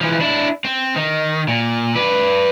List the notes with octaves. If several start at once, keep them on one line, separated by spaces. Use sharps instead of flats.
E3 F3
D4 E4
C4
D#3
A#2
B4 D5